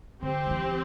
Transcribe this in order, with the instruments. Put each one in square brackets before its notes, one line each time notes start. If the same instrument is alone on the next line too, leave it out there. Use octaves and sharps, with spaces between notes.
[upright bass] D3 [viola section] C4 G4 C5
[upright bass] G3
E3